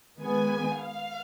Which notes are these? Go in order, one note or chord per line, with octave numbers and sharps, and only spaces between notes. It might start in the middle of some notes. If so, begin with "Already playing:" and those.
D#3 G#3 B3 G#5
F5